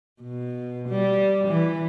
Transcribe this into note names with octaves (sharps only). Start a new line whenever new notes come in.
B2
G3
E3